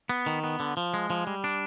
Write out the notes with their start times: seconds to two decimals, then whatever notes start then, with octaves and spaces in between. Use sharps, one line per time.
0.09 B3
0.26 D#3
0.44 B3
0.60 D3
0.77 F3
0.94 G#3
1.10 F3
1.27 G3
1.44 D4